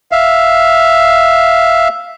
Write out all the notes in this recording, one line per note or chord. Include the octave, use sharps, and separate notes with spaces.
E5 F5